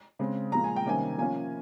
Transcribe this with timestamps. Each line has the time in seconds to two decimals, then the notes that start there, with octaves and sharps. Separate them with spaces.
0.19 C#3 G#3 C4
0.52 A#2 F3 G#3 A#5
0.64 G#5
0.76 G5
0.86 C3 D#3 G3 A#3 C#4 G#5
1.18 F3 A#3 C#4 G#5